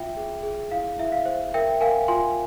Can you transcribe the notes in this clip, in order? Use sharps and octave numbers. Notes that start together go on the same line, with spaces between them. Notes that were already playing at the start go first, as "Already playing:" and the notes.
Already playing: F4 E5 G5
G#4
G#4
E4 F5
E4 E5
F5
C5
A#4 E5 G5
A#4 F5 G#5
F4 G#5 C6